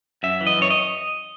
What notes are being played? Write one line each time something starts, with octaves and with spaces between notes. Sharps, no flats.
F#2 E5
E3
D#5
F#2 C#5
D#5